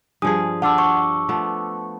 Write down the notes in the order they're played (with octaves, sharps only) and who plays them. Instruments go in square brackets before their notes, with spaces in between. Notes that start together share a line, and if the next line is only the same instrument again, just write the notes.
[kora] G2 F3 G#4 [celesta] G#5 [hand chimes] D#6
[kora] D4 F5 [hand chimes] F#5 C6 [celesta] A5 D6 E6
[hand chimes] C#6
[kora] F3 A3 B3